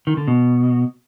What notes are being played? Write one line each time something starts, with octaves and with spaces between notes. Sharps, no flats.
D#3
D3
B2